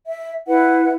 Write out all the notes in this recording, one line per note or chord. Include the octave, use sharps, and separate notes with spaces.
E5
E4 B4 F#5